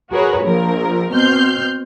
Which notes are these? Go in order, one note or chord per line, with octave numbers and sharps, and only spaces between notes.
F#4 G#4 A#4 B4 C#5
A#1 F3 A#4
B2 C4 F6 G6 C7